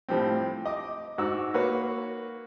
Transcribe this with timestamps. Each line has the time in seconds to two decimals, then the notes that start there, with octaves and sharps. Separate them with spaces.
0.09 A2 F3 G3 C4
0.65 D#5 D6
1.18 G#2 F#4 D6 E6
1.54 A#3 F#4 B4 C#5